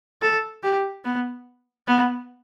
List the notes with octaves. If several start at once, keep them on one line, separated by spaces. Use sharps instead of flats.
A4
G4
B3
B3